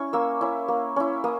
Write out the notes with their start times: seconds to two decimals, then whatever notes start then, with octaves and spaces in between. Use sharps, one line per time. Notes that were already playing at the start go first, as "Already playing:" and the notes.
Already playing: C#4 E4 C#6
0.13 A#3 E6
0.41 C#4 E4
0.68 A#3
0.96 C#4 E4
1.24 A#3 D#6